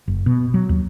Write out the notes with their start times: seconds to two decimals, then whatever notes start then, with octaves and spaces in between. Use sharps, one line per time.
0.08 F#1
0.26 B2
0.54 F#3
0.69 D#2